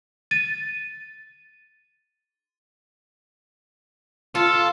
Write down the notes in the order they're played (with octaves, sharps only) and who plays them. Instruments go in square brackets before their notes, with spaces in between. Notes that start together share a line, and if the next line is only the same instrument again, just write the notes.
[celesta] A6 D#7
[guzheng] F4 [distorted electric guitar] A4